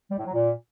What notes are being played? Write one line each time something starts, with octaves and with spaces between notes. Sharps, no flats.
G3
A2
F#3
A#2